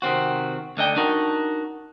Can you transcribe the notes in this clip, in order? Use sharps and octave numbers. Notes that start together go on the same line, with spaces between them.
C3 D#3 C4 F#4
D2 D3 D#5 G5
D4 D#4 F#4 A#4